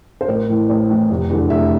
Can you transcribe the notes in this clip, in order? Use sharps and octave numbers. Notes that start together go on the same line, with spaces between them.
C5
A1 A#4
A2 E3
A1
A2 E3
F1
E2 D3
F1 E5